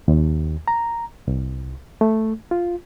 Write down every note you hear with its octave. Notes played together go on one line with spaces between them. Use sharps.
D#2
A#5
C2
A3
F4